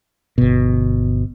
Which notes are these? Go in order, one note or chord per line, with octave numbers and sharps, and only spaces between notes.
G1 B2